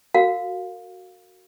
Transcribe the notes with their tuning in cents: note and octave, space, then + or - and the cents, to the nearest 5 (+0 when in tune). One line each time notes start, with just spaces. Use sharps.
F#4 +0 A#4 -35 F5 +15